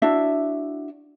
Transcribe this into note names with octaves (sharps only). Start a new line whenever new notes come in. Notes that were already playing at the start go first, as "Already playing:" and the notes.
D4 E4 F#4 E5